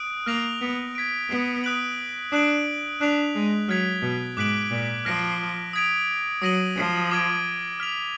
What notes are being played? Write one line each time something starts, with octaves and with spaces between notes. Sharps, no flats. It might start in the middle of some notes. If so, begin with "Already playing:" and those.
Already playing: D#6 F#6 D7
A#3 F6 A#6 F7
B3
G#6 B6 D7
B3
D#6 F#6 D7 F#7
D4 D#6 F#6 D7 F#7
D4 F#6 B6 F7
G#3
F#3 F6 G#6 B6 F7
B2
G#2 D6 F#6 B6 D7 F#7
A#2
F3 F6 A#6 D7
D#6 G#6 B6 D7 F7
F#3 D#6 A#6 D#7 F#7
F3
D6 F6 G#6 D7
F6 B6 F7